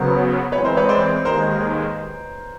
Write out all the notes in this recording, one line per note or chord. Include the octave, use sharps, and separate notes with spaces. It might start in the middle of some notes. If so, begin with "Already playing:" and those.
Already playing: C#3 F#3 B3 A#4 C5
E3 G#3 C4 B4 C#5
A#4 C5
B4 C#5
C5 D5
D#2 D#3 G#3 A#4 C5